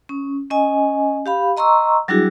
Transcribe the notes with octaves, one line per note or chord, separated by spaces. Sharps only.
C#4
C#4 D#5 G#5
G4 F5 B5
D#5 A#5 C6 C#6 E6
F#3 G3 D4 E4 F#4 G#4